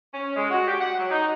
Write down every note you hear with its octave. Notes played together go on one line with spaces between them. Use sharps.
C#4
G#3
F#4
G4
F#5
F#3
D#4